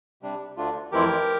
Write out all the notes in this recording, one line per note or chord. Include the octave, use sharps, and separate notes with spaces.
C3 G3 D4
D2 D3 A3 D4 F4
F2 E3 A3 C4 E4 G4 A#4